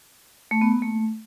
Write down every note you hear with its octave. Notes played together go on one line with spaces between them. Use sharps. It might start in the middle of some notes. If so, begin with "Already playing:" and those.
A3
B3
A#3
A3